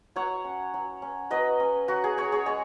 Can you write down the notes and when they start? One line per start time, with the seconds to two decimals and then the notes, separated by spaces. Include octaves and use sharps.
0.16 F#3 C#5 F#5
0.44 C#4
0.74 F#3
1.02 C#4
1.31 F#3 B4 D#5
1.60 C#4
1.88 F#3 F#4
2.04 G#4
2.17 C#4 G#4 C#5
2.32 G#4 C#5
2.46 G#3 G#4 C#5